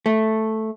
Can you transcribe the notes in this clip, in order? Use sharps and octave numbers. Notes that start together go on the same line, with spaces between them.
A3